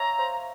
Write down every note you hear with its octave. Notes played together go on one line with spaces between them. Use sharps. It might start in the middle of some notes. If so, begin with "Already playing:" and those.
Already playing: C#5 E5 F5 A#5
C5